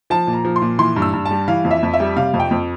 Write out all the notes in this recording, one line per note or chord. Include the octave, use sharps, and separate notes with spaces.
F3 A5
A#2
A#5
F3
C6
A#2
E3 C6
G2
E6
G2
A5
G3
E3 F5
F2
E5
F2
E5
G3
C3 F5
F2
G5
F2